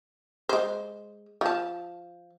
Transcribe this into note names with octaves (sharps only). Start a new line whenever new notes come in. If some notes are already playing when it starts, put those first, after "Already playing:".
G#3 C5
F3 A5